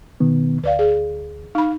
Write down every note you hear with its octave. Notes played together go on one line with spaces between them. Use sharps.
B2 D#3 B3
D2 B4 D5 F5
G#4
D#4 F5 B5